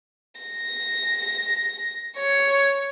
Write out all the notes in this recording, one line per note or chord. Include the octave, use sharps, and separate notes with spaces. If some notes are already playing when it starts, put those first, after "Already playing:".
A#6
C#5